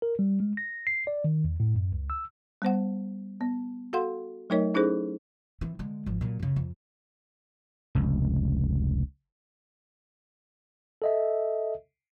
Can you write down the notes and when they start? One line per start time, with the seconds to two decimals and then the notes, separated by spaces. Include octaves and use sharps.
0.02 A#4
0.19 G3
0.40 G#3
0.57 A#6
0.87 C7
1.07 D5
1.24 D#3
1.44 E2
1.60 A2
1.75 F#2
1.92 C#2
2.10 E6
2.62 G3 B3 C5 F#5
3.41 B3
3.93 F#4 A4 F5 F#5 C6
4.50 F#3 A3 D#4 A#4 C#5 D#5
4.74 C#4 D#4 E4 G#4 A4 C5
5.61 E3 C4
5.79 D3 G#3
6.06 G#1 F3
6.21 A#2 F#3
6.40 F#2 C#3
6.56 F2
7.95 F1 C#2
11.02 A4 D#5 E5